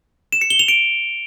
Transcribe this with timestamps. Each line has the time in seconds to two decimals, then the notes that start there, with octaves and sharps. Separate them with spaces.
0.32 E7
0.41 C#7
0.50 G7
0.59 F7
0.68 D7